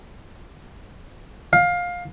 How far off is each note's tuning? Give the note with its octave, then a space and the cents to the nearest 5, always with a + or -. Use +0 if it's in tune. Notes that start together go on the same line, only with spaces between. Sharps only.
F5 +20